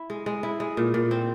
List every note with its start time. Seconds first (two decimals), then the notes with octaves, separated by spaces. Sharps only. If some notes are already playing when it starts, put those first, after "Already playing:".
Already playing: E4
0.10 G#3
0.26 G#3
0.43 E4
0.60 G#3
0.77 A#2
0.94 A#2
1.11 C4